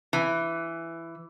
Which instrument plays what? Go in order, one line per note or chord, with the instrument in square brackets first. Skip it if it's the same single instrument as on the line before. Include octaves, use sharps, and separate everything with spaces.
[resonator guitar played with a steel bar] E3